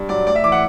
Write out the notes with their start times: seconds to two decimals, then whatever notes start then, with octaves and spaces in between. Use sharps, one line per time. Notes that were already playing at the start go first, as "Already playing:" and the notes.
Already playing: G2
0.09 F#3 D5
0.26 A2 D5
0.35 E5
0.44 E3 D6
0.52 F#5